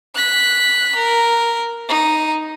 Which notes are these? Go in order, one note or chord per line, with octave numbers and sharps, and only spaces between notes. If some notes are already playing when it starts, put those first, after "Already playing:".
F#6 B6
A#4
D#4